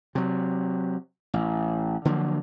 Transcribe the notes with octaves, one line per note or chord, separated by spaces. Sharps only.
C3 F#3
A1
D3 F3 F#3 A#3